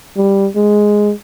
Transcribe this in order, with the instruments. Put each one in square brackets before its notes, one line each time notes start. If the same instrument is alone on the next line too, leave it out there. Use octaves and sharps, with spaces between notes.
[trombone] G3
G#3